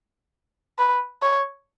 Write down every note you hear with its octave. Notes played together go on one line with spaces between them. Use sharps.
B4
C#5